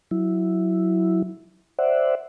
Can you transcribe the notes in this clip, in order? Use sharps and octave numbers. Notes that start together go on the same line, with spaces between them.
F#3 E4
C5 D5 E5 F#5